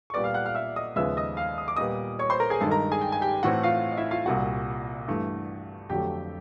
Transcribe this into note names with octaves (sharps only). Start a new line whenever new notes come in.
C#6
A#2 G3 B3 D5 D6
F5 F6
F#5 F#6
F5 F6
E5 E6
D#5 D#6
D#2 C#3 F3 G#3 B3 E5 E6
D#5 D#6
F5 F6
D#6
D6
A#2 G3 B3 D#5 D#6
C#5 C#6
C5 C6
A#4 A#5
G#4 G#5
G2 D#3 G#3 A4 A5
A#4 A#5
G#4 G#5
G5
G#5
G4 G5
A2 E3 A3 C4 F#4 F#5
F4 F5
D#5
E4 E5
F4 F5
C2 A#2 G3 F#4 F#5
G2 E3 A3
F2 D3 F#3 A3 G4 G5